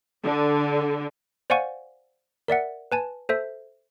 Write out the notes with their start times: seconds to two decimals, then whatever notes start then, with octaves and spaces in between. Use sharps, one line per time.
0.24 D3
1.50 C5 D5 F5 F#5 G#5 C#6
2.48 A#4 D5 E5 F#5
2.92 B4 G#5 A5
3.29 A4 C5 E5